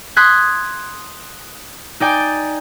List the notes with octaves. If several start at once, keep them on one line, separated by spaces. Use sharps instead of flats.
C6 D#6 F#6 G#6 B6
D#4 D5 G5 G#5